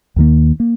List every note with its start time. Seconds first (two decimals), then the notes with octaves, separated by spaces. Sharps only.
0.16 D#2 D#3 A#3
0.60 A#3